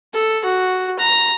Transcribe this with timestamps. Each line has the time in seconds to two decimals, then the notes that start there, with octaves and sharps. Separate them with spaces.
0.14 A4
0.44 F#4
0.99 A#5